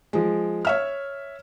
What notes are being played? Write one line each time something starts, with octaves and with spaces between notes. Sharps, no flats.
F3 G#3
C#5 E5 F6